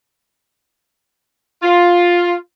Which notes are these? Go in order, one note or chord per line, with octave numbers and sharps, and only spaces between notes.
F4